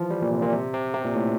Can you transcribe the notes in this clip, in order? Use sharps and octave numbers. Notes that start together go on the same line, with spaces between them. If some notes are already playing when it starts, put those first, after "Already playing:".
Already playing: E3 F3
G3
A#2
C3
A#2
C3
C3
C3
A#2
A2